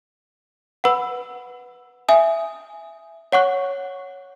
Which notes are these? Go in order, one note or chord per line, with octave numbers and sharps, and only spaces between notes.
B4 F#5 B5 E6
E5 G#5 D#6
C#5 F#5 C#6 F#6